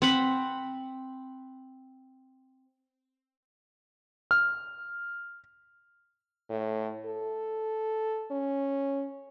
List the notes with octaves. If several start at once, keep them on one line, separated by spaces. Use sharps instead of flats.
C4 F#5 B5
F6
A2
A4
C#4